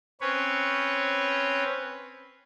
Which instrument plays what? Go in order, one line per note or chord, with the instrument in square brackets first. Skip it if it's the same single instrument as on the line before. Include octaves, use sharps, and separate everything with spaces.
[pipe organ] C4 C#4 B4 C#5